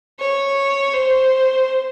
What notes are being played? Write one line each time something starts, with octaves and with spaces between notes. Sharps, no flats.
C#5
C5